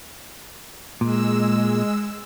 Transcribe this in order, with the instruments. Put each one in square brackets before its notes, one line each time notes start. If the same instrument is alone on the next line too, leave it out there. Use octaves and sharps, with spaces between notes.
[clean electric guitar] A#2 [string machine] G#3 E6